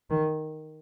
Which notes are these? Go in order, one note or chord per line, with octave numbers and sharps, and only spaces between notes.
D#3